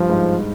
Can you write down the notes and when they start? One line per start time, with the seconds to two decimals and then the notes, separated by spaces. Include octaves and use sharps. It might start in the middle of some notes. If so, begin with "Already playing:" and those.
Already playing: G2 F3
0.10 G#2